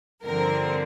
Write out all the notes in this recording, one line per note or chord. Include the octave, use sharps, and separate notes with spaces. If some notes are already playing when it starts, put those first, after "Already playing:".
G2 D3 F3 C4 A#4